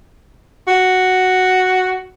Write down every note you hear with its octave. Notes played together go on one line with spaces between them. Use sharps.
F#4